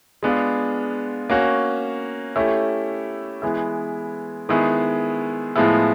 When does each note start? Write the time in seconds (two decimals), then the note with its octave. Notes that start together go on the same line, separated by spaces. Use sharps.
0.23 G#3 B3 D4 F4 G#4
1.30 A#3 C#4 F#4
2.36 A3 C#4 E4 G4
3.42 E3 G#3 B3 E4
4.49 D#3 G#3 B3 E4 G#4
5.56 A2 F3 G#3 B3 E4